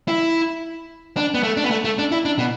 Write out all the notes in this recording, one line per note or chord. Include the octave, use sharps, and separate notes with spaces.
E4
D4
B3
A3
D4
B3
A3
A3
D4
E4
D4
B2